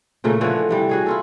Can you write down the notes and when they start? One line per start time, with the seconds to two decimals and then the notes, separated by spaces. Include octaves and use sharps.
0.24 A#2 C#3 E3 A3
0.41 D3 E3 F3 C#5
0.69 C3 E3 G3
0.89 F#4 G#4 C#5
1.06 E4 F4 A4